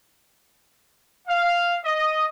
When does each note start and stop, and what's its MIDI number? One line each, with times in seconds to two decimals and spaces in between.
1.27 1.76 77
1.84 2.27 75